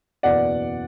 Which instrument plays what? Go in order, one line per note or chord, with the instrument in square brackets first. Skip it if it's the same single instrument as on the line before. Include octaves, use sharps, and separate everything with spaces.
[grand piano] F#1 E2 B2 D5 F#5